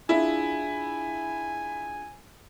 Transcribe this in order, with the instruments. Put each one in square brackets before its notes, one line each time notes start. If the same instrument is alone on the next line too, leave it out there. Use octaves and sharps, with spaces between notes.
[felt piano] D4 F4 G#4 [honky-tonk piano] E4 [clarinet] G#5